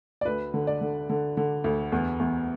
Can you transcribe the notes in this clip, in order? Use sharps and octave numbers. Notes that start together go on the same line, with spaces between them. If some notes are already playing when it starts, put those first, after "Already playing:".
D5
D2 B4
D3
D5
D3
D3
D3
D2
E2
E2